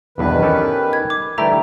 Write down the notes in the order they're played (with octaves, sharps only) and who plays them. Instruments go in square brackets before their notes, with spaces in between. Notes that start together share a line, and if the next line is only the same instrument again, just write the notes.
[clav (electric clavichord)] B1 E2 G2 [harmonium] D#3 B4
[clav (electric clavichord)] C#4 G4 A4
[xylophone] G#6
D6
[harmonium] D3 E3 G3 [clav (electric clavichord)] A3 E4 G5 [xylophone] E5 A#5